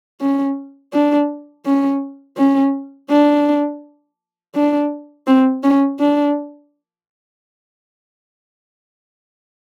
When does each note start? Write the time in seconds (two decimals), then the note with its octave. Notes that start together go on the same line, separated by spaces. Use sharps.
0.20 C#4
0.93 D4
1.65 C#4
2.37 C#4
3.10 D4
4.55 D4
5.27 C4
5.63 C#4
5.99 D4